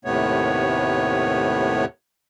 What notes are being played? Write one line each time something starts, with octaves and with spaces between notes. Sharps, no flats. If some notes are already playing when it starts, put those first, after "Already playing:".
D#2 A2 C3 A3 B3 C#5